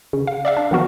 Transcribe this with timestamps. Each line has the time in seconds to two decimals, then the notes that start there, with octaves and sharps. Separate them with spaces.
0.13 C#3
0.27 F5
0.45 D5 E5 F5
0.57 D4
0.71 D#3 F3 B3 F#4 A#4